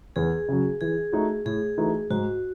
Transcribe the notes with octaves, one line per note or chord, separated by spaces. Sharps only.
E2 G#4
C#3 F#3
E3 G#4
A3 D#4 F#4
A2 G#4
E3 A3 D#4 F#4
G#2 F#4